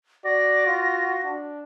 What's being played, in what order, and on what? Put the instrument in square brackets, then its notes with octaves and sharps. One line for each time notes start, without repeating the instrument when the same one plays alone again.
[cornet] F#4 [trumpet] D5 [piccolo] A#6
[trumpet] F4
D4